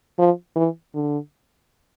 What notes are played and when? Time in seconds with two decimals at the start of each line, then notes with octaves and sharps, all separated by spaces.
0.19 F3
0.56 E3
0.95 D3